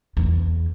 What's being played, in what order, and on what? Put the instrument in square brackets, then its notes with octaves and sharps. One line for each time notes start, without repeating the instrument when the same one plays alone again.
[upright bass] E2